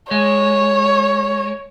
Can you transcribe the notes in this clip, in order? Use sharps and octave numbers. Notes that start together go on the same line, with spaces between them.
G#3 C#5